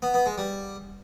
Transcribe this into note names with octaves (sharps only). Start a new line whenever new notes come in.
B3
B3
G#3
G3